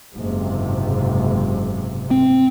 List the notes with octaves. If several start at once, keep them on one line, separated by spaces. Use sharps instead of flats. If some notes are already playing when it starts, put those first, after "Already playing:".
F#1 G#2 C3
C4